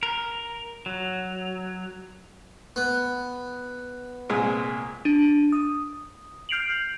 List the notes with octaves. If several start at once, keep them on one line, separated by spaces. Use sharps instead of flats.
A#4
F#3
B3
C2 A#2 G#3
D4 D#7
D#6
F6 G6 C7 D7 F7 F#7